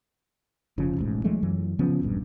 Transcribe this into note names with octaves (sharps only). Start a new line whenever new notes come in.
F1 C#3 F3
D#1 A1 G#2
E3 F#3 G#3 A3
F#2 E3 F#3
C#3 F3 B3 C#4
E1 A#1 G2